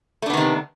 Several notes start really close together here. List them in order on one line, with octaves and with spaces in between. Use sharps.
A3 D4 B3 D#3 C3